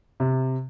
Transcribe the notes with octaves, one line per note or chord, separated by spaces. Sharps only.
C3